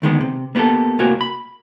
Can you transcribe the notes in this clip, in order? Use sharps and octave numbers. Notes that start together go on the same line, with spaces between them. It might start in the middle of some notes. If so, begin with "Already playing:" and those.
D2 D#3 G#3 B3
C3
A#3 B3 F#4 G4 A4
C2 A2 A#3 C4 F#4 G#5
B5